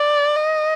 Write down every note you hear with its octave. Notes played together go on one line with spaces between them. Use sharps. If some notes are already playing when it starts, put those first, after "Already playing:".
Already playing: D5
D#5